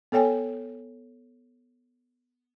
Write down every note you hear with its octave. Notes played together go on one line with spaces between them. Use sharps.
B3 A4 C#5 G5 G#5